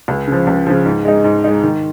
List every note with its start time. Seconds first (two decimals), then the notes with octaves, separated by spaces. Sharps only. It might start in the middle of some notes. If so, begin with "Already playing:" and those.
0.08 C#2
0.27 C#3 F3
0.47 C#2
0.67 C#3 F3
0.85 G#2
1.05 G#3 D#4
1.24 G#2
1.44 G#3 D#4
1.63 D#3